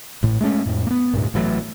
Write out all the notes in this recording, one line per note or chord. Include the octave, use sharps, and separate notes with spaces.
A1 A2
G#3 A3 C4 C#4
F2 A2
A#3 B3
D2 G2 A#2
A1 E3 F#3 A3